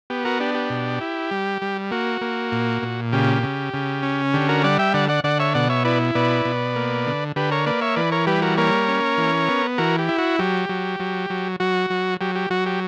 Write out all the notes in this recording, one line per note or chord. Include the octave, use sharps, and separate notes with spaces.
B3 G4
F#4 A#4
D4 G4
G4
B2
E4
G3
G3
A#3 F#4
A#3
A#2
A#2
C#3 G4
C#3
C#3
C#4
D3 G4
F#4 A#4
G3 D5 F#5
E5 G5
D3 D5 F#5
D5 F#5
D3 D5 F#5
C#5 E5
B2 D5 F#5
C#5 E5
E4 B4 D5
B2 B4 D5
B2
A#3
D3
D3 G4 B4
A#4 C#5
A#3 B4 D5
C#5 E5
E3 B4 D5
A#4 C#5
G3 G4 B4
F#4 A#4
A#3 A#4 C#5
C#4
E3
B3
E3 F#4 A#4
G4
E4
F#4
F#3 G4
F#3
F#3
F#3
F#3 F#4
F#3
F#3 G4
G4
F#3 F#4
G4